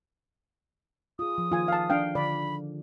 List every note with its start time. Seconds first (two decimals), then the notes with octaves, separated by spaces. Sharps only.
1.19 F4 G#4 D#6
1.38 F3
1.52 D#3 F3 F4 G#5
1.68 F5 A5
1.90 D4 F5 G5
2.15 D3 D5 B5